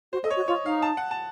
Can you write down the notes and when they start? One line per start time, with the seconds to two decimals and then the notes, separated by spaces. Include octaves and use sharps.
0.13 F#4 C5
0.24 A4 D#5
0.30 C#5
0.36 F#4
0.48 F4 C#5
0.65 D#4 F5
0.82 A5
0.97 F#5
1.11 A5